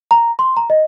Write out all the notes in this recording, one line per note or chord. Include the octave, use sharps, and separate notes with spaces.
A#5
C6
A#5
D#5